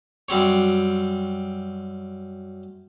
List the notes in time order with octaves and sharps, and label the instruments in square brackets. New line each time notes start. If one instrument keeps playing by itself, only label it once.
[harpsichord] F#2 G3 C4 C#5